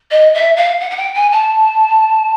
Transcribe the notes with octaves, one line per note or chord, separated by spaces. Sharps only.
D#5
E5
F5
F#5
F#5
G5
G#5
A5